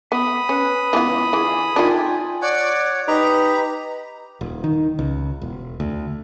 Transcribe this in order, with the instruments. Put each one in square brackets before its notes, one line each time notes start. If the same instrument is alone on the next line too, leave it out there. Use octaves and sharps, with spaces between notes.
[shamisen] B3 [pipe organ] B5 D#6
[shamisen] C#4 [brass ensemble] B4
[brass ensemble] C#2 [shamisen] E3 B3 F4
[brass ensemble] D3 F4 G#4 [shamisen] E3
[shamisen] D#3 D4 [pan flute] F4 [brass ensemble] G5 G#5
[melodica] C#5 F#5 [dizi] D5
[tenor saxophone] D#4 [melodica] G4 B5 [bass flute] B4 [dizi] A#5
[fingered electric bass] D#1
D#3
C#2
E1
D2